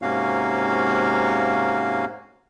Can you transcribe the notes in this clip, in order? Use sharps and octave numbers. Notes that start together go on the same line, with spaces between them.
G#2 C3 A#3 C#4 F#4 F5